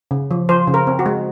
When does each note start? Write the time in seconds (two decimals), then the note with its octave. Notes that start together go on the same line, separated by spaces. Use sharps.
0.11 C#3
0.31 F3
0.49 F3 C5
0.67 C#3
0.74 A#4
0.87 C4
0.99 F#4
1.06 G#3